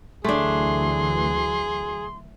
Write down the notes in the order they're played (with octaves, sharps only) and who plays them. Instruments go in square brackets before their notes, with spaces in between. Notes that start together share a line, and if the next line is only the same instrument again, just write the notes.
[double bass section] D2 E3 F#3 [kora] A3 D4 [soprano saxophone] G#4 [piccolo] C6